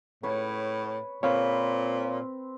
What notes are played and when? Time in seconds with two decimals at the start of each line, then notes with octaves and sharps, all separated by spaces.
0.23 A2 B4 C#5
1.23 A#2 C4 B4 C#5 F5